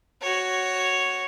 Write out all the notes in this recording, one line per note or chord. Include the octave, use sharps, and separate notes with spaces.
F#4 C#5